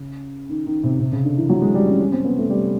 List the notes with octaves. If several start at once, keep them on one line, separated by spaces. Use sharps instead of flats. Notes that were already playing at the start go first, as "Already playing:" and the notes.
Already playing: C#3
D#3
D#3
C3
C3
C#3
D3
E3
F#3
G#3
G3
C#4
C#4
C4
B3
A3
G3